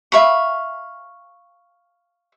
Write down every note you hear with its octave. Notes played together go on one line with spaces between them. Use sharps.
E5 F5 B5 C#6